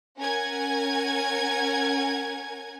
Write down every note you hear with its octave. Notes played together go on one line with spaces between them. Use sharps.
C#4 A#4 F#5 G#5 G#6